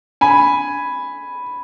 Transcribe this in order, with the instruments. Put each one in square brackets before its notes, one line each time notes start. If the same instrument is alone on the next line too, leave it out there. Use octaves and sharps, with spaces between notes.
[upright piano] G#5 B5